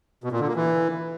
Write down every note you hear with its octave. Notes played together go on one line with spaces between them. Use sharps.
B2
A#2
D3
A#3
E3